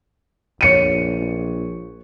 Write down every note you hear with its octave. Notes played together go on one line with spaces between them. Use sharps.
A#1 C#5 C#7 D#7